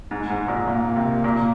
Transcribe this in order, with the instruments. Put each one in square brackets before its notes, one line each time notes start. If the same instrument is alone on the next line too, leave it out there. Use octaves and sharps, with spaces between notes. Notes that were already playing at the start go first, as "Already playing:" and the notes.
[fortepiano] G#2
G#2
A#2
[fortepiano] A#2 [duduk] A#3
[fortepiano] C3
A#2